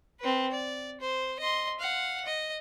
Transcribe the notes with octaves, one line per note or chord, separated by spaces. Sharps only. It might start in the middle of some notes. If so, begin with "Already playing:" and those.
C4 B4
D5
C5
D#5 C6
F5 F#5
D#5